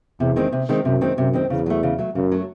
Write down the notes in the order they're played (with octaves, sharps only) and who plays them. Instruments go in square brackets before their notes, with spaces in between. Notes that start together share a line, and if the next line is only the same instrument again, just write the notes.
[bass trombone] E2 [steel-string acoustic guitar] C3
[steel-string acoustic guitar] D#3 G#3 C4
C3
D#3 G#3 C4
[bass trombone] F#2 [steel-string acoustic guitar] C3
[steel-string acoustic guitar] D#3 G#3 C4
[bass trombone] F#2 [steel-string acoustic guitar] C3
[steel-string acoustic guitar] D#3 G#3 C4
[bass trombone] E2 [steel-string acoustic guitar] C#3
[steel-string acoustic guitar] F#3 A3
C#3
F#3 A3
[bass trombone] F#2 [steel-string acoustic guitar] C#3
[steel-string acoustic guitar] F#3 A3